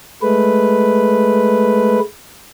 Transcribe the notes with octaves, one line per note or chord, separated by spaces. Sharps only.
G#3 A3 B4